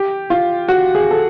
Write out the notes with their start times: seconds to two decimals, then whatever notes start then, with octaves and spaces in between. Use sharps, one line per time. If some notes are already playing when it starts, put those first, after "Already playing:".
Already playing: G4
0.30 F4
0.69 F#4
0.95 G#4
1.11 A4